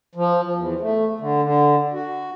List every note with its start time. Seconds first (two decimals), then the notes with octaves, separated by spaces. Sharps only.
0.15 F3
0.56 E2
0.81 A3
1.20 D3
1.43 D3
1.93 F#4